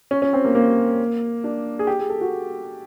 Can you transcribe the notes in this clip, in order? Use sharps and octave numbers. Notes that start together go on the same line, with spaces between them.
C#4
C#4
C4
A#3
A#3
D4
G#4
G4
G#4
A4
F#4